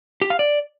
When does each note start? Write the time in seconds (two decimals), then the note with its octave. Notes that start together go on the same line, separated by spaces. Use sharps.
0.21 G4
0.30 F5
0.39 D5